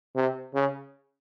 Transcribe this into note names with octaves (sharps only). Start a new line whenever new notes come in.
C3
C#3